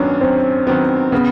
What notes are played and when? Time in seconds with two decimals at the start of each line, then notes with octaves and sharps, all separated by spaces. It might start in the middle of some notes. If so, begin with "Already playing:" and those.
Already playing: F#2 D#3 F#3 B3 C#4 D4
0.21 F#2 C4
0.67 D#3 F#3 B3 C4
1.12 C#3 B3